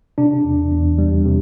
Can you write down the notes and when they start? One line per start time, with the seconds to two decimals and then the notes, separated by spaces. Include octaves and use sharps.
0.18 C3 D4
0.45 E2
0.72 E2
0.98 G3
1.25 C3